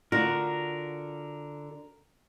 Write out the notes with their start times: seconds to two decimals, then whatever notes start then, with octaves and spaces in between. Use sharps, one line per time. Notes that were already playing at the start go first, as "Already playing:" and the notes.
0.12 D3 F4 F#4 A#4